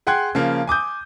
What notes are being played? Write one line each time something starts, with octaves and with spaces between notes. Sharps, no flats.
G#4 F#5 G5 C6 F#6 G#6
C#3 F3 A#3
G#5 D6 D#6 G6